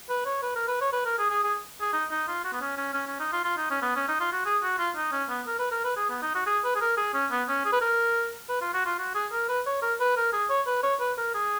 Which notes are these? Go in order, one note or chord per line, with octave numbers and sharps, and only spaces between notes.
B4
C#5
B4
A#4
B4
C#5
B4
A#4
G#4
G#4
G#4
G#4
D#4
D#4
F4
F#4
B3
C#4
C#4
C#4
C#4
D#4
F4
F4
D#4
C#4
B3
C#4
D#4
F4
F#4
G#4
F#4
F4
D#4
C#4
B3
A#4
B4
A#4
B4
G#4
B3
D#4
F#4
G#4
B4
G#4
A#4
G#4
C#4
B3
C#4
G#4
B4
A#4
B4
F4
F#4
F4
F#4
G#4
A#4
B4
C#5
A#4
B4
A#4
G#4
C#5
B4
C#5
B4
A#4
G#4